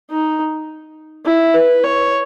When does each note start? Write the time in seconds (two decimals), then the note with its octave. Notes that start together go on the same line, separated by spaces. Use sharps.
0.10 D#4
1.26 E4
1.54 B4
1.83 C#5